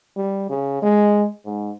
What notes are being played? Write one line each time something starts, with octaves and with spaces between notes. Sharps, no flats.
G3
C#3
G#3
G#2